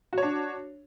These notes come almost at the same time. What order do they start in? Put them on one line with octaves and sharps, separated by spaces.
F#4 C#5 D4